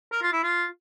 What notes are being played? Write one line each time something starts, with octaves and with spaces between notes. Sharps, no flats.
A#4
F4
E4
F4